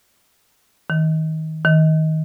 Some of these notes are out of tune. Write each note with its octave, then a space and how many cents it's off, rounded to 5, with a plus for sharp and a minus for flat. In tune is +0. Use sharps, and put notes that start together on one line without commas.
D#3 +25
D#3 +20